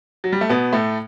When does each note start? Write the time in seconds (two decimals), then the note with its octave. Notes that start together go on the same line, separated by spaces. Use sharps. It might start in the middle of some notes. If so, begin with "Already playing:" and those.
0.24 F#3
0.32 G3
0.41 A3
0.49 B2 B3
0.72 A2 A3